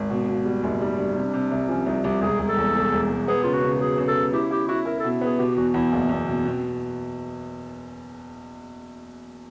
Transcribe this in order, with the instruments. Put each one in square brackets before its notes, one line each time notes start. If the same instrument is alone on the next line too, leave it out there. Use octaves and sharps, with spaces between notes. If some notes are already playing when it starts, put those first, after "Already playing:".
Already playing: [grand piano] G#1
[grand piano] B2 [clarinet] A#3
[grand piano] B2 [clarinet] A#3
[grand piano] G3 [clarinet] B3
[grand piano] F#1 [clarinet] D#4
[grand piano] G3 [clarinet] D#4
[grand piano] G3 [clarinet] D4
[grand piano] C3 [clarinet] D#4
[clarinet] D4
[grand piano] C3
C2
[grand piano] F3 [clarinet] C#4
[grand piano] C2 [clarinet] D#4
[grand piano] C2 [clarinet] G4
[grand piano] E1 [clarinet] G#4
[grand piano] E1
[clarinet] A4
[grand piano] E2
E1
E1
E1
[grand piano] B3 [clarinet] G#4
[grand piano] C#3 [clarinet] F4
[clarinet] F#4
[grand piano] C#3
[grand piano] F#3 [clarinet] G#4
[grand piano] C#3
[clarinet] A4
[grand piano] C#3
[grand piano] E4 [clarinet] G4
[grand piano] E4 [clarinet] G4
[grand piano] E4 [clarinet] F#4
[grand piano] E4 [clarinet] A#4
[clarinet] A4
[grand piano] B2
[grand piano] B3 [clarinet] G#4
[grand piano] B2 [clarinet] G4
[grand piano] E2 [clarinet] F#4
[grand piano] E2 [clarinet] E4
[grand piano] F#1 [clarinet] A#3
[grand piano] E2 [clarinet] B3
[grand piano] B2 [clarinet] C#4
[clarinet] B3
[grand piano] B2 [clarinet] C4